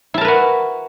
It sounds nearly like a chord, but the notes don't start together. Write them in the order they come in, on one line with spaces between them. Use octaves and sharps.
E4 A5 A#4 B4 F#4